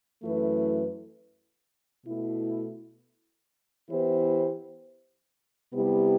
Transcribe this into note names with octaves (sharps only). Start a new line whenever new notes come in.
F#2 E3 A3 E4 B4
B2 A3 E4
E3 B3 E4 G4 C5
C3 G3 B3 E4 G4